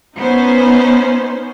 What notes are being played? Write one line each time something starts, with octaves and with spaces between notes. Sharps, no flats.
B3 C#4 D#4 C5